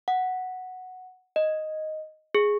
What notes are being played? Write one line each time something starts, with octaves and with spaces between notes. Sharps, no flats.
F#5
D#5
G#4